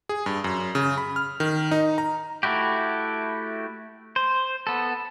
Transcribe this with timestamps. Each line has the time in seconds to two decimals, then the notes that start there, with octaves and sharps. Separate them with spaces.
0.09 G#4
0.26 G2
0.44 F#2
0.75 C#3
0.98 B5
1.16 F6
1.40 D#3
1.71 D#4
1.98 A#5
2.43 A3 E4 F#4 G4
4.16 C5
4.67 B3 A4